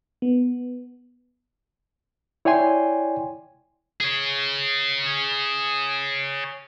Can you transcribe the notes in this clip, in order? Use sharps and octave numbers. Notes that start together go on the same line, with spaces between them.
B3
E4 C#5 D5 G5 G#5 C6
G#4 C#5